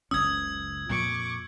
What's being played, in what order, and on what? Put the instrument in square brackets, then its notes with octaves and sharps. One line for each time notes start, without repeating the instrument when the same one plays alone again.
[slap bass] F#1 C#2 C#4 [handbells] D#6 [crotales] E6 G#6
[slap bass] F2 A#2 [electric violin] C#6 D6